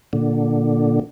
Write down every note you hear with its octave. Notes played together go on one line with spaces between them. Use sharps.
A#2 D3